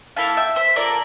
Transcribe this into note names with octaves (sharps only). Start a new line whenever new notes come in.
A#3 E4 A4 F5 A5
E5 G5
C5 E5
A#3 F4 A4 A#4 D5